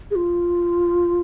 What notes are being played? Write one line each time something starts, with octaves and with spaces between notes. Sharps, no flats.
G#4
F4